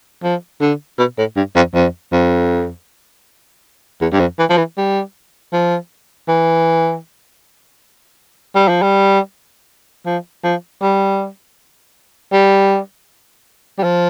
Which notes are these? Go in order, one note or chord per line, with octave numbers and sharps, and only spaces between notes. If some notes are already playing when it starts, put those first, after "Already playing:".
F3
D3
B2
A2
G2
F2
F2
F2
E2
G2
F2
E3
F3
E3
G3
F3
E3
G3
F3
G3
F3
F3
G3
G3
G3
F3